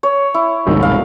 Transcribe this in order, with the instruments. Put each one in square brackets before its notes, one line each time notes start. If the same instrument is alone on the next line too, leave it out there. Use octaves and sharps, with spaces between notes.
[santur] C#5
E4
[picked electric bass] E1 C2 G#2 [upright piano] D#3
[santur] F5